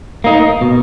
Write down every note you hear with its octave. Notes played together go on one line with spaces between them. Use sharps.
A#3 D#4
B2